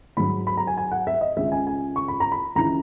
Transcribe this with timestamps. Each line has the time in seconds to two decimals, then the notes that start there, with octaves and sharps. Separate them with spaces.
0.17 G#2 F#3 B5
0.47 B5
0.57 A#5
0.67 G#5
0.77 G#5
0.91 F#5
1.07 E5
1.21 D#5
1.37 C#2 C#3 G#3 E5
1.52 G#5
1.67 G#5
1.96 C#6
2.08 B5
2.20 A#5
2.32 B5
2.55 C#2 C#3 E3 G#3 A#5